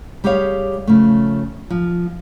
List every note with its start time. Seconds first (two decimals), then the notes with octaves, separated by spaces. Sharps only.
0.24 G3 G4 G#4 C#5 F5
0.87 C#3 F3 A3
1.70 F3